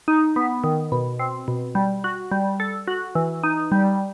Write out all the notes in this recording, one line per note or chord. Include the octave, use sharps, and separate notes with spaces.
D#4
B3
D#3
B2
C4
B2
G3
F#4
G3
A4
F#4
E3
D#4
G3